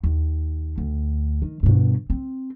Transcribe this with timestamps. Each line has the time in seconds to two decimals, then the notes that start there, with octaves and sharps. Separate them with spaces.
0.04 D#2
0.78 D2
1.42 D#3
1.63 G2 B2
2.10 C4